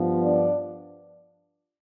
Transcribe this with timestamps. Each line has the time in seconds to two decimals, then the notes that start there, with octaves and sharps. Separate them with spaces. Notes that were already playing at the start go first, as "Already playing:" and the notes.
Already playing: G2 F3 B3
0.22 D4 D5